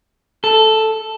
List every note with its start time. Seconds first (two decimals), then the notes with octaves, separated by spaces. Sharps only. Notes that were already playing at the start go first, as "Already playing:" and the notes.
0.44 A4